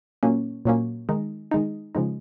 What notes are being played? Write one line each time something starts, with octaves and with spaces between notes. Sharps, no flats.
A#2 F#3 A#3 C#4
A#2 F#3 A#3 C#4
D#3 G#3 D#4
D#3 G#3 D#4
C#3 F3 G#3 D#4